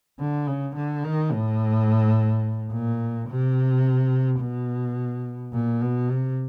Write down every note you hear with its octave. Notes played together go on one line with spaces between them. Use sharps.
D3
C#3
D3
D#3
A2
A#2
C3
B2
A#2
B2
C3